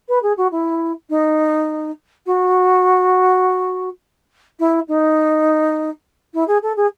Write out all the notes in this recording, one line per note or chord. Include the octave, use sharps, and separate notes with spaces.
B4
G#4
F#4
E4
D#4
F#4
E4
D#4
E4
G#4
A4
G#4